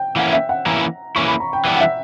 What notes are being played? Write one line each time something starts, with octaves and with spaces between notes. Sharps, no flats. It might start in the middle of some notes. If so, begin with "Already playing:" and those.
Already playing: G5
E3 A#3 C#4 E4 F#5
E5
F#5
E3 A#3 C#4 E4 A#5
E3 A#3 C#4 E4 C#6
B5
A#5
G5
E3 G3 B3 D4 G5
F#5
E5